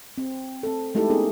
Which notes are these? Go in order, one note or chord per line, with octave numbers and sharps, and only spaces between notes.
C4
C4 A4
G#3 A3 D#4 E4 G4 A4
B3 C#4 D#4 G#4 A#4